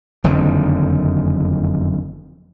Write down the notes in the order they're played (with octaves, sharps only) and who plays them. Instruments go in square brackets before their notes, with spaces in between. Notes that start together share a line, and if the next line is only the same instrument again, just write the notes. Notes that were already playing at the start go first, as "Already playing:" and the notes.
[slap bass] F#1 F2 D3 D#3